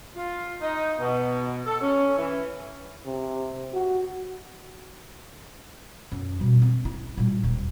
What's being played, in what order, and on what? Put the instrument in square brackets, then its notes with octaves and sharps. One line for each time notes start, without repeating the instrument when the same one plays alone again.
[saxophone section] F4
D#4
B2
A4
C#4
E3
[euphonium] C3
F#4
[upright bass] F#2
B2 G3
C4
E4
A#2 G3
D#1